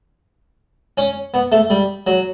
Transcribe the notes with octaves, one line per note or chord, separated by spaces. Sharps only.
C#4
B3
A3
G3
F#3